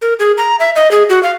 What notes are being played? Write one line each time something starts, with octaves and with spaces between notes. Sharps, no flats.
A#4
G#4
A#5
E5
D#5
G#4
F#4
F5